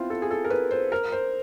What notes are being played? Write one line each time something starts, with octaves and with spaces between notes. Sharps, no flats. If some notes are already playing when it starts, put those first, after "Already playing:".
Already playing: B3 C4 E4 F4
A4
G#4
A4
A#4
B4
C5
A#4
C5